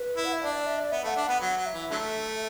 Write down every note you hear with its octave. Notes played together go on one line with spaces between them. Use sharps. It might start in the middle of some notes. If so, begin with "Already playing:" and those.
Already playing: B4
E4
F#5
E5
D4 D5
D5
E5
D5
B3 E5
A3
F#5
D4
B3 F#5
F#3 F#5
F#3
E5
E3
D3 F#3 A3